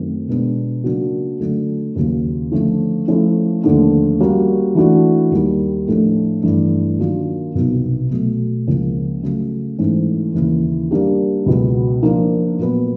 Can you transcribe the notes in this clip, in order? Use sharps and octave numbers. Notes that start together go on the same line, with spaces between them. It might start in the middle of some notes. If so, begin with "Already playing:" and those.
Already playing: F#2 D#3 F#3 A3 C4
B2 G#3 B3 D4
C#3 F#3 A#3 D4 F#4
D3 F#3 A3
D#2 C#3 F#3
D3 F3 A3 C#4
F3 A3 C#4 E4 A4
D#2 D3 F3 A3 D4
G3 A#3 C#4 F#4 A#4
E3 A3 D4 F#4
D#2 D#3 G3
A2 F3 A3 D4
G2 E3 A3
D#3 F#3 A#3 D4 F4
C2 B2 F#3 B3 D#4
B2 F#3 A3
C#2 C#3 F3 A#3 C#4
C#3 F#3 A3
G#2 E3 A3 C#4
D#2 C#3 E3
G3 A#3 D4 G4
C#2 B2 F#3 B3
F3 A#3 D4
A#2 F#3 B3